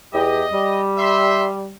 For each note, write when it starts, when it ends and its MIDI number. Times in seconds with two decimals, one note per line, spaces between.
0.14 0.45 40
0.14 0.45 67
0.14 0.79 75
0.53 1.73 55
0.98 1.46 76
0.98 1.46 84